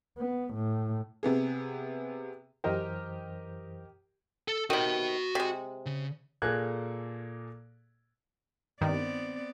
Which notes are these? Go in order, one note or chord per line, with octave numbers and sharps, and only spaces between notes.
B3
A2
C3 B3 G#4
F#2 E3 G4 A#4 C5 D#5
A4
C3 D#3 F#4 B5
C3 G#3
C#3
A#2 A#3 G#4 A4 F#6 G#6
G2 D#3 B3 C4 D5